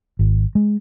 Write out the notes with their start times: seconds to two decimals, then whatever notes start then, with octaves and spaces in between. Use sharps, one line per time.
0.19 G#1
0.55 G#3